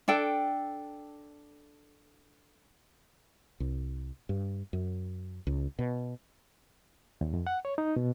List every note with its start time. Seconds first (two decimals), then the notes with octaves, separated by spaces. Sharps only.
0.08 D4 A4 G5
3.60 C2
4.29 G2
4.73 F#2
5.47 C#2
5.79 B2
7.21 D#2
7.34 F2
7.47 F#5
7.65 C#5
7.78 D#4
7.96 B2